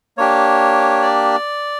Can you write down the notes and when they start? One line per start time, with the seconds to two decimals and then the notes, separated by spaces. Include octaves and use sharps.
0.18 A#3 D4 G4 C#5
1.02 D5